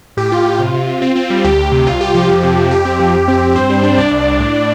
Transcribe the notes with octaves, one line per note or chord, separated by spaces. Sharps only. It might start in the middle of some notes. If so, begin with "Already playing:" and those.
A2 G4
A2 F4
A2 F4
C3
C3
C3
C4
C4
G3
D2 G4
D2
C3
C2 F4
C2 G4
F3 G4
F2
C3
F3
F2 G4
C4
F3
F2
C4
C4
G2 C4 C5
G3
D4
C2 D4 D5
C2
C2
A2
A2